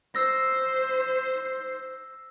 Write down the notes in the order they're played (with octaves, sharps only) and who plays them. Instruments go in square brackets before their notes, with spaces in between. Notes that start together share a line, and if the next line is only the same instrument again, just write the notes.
[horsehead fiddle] C5 [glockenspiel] E6 A#6